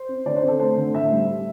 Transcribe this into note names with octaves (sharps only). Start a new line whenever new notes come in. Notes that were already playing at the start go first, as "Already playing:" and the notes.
Already playing: C5
C4
D3 D5
C5
C4
A4
A3 C5
D3
A2 E5
G3
G3